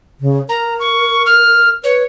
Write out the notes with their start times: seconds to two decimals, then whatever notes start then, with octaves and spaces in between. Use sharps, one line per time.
0.20 C#3
0.49 A#4 A#5
0.80 C#6
1.26 F6
1.84 B4 C#5